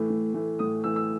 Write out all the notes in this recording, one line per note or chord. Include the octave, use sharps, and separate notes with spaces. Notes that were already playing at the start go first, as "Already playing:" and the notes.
Already playing: A2 E3 A3
A2
E3 A3
A2 D#6
E3 A3 E6
E6